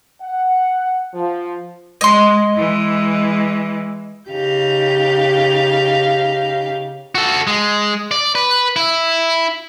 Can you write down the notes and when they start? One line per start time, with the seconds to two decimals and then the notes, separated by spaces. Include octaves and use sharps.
0.21 F#5
1.14 F3
2.01 G#3 D#5 C6
2.53 E3 G#3
4.30 C#3 D#4 G4 F5 G6
7.15 F#4 A4
7.47 G#3
8.11 D5
8.35 B4
8.76 E4